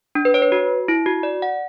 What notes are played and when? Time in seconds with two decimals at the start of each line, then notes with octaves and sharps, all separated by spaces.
0.15 D4
0.25 B4
0.34 C#5
0.42 B4
0.52 F#4
0.88 E4
1.06 F#4
1.23 D5
1.42 F#5